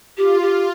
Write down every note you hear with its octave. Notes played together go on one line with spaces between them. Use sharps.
F4 G4
G4